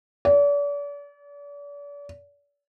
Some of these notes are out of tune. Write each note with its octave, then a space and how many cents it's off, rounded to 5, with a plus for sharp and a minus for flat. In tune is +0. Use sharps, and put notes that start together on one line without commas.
D5 -40